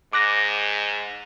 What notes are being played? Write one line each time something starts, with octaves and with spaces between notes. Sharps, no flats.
G#2 D6 F#6 A#6